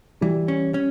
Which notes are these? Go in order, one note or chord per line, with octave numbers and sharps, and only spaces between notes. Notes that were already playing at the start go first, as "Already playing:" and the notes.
E3 G3
C#4
C#4